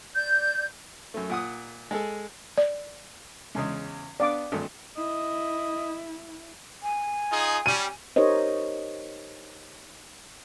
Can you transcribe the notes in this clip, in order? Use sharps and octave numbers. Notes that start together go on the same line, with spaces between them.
D5 G6
F#2 A3
A#2 F#5 D#6
G#3 G#4 A4
D5
E2 C#3 G#3
B3 D4 D5 F5 D6
G#1 G2 A3
E4 D#5
G#5
D#4 F4 G#4
G3 C#4 D#7
D#4 G4 A#4 C5 C#5 D#5